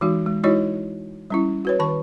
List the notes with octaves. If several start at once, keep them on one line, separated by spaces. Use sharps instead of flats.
E3 G#3 D#4 F#4
G#3
G#3 D#4 E4 F#4 C#5 D#5
G3 C#4 E4
F#4 B4 C#5
D#3 A5 C#6